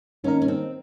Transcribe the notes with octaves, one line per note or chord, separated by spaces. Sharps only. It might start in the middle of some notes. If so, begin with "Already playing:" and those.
D#3 A#3 C#4 D#4 A#4
C#4
C4